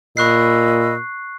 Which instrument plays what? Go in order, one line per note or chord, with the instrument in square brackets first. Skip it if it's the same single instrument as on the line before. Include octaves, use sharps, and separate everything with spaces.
[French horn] A#2 [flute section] D#5 B5 E6 [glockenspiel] C#6 F#6 C7